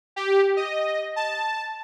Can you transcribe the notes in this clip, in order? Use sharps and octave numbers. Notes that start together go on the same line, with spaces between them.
G4
D#5
A5